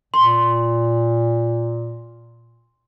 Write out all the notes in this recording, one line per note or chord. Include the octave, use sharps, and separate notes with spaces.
A#2 C6